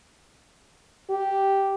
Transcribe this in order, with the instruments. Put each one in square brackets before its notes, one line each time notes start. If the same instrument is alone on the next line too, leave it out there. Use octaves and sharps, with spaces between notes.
[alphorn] G4